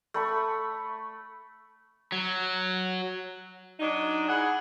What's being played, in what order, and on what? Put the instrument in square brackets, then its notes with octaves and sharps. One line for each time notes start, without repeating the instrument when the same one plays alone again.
[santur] A3 B5 C#6
[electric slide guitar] F#3
[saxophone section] F#3 D4 D#4
E4 G#4 F#5